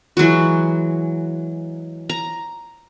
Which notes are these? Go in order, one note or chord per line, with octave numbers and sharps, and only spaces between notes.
E3 F#3 G#3 F#4
A#5